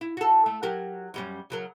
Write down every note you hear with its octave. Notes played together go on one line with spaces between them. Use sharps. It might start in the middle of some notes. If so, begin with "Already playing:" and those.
E4
F#4 A4
A3
F#3 G4 A#4
F#2 G3 C#4
C#3 F#3 A#4